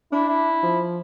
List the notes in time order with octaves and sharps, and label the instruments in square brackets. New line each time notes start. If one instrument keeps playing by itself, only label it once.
[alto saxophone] D4 [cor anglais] E4
[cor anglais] E4
[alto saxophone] F3